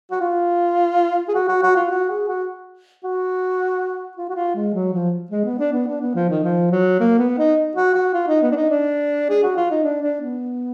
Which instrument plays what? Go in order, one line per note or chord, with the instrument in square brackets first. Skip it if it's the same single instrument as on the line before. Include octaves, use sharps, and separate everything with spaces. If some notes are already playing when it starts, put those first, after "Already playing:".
[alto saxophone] F#4
F4
G#4
F#4
F#4
F#4
F4
F#4
G#4
F#4
F#4
F4
F#4
F4
G#3
F#3
F3
G#3
B3
D4
B3
D4
B3
F3
D#3
F3
F#3
A#3
B3
D#4
F#4
F#4
F4
D#4
B3
D4
D#4
D4
G#4
F#4
F4
D#4
D4
D4
B3